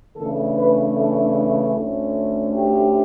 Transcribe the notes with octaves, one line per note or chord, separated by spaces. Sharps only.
C#3 E3 A3 D4 A4
B4
A4
D2 D3 A3 C#4
G4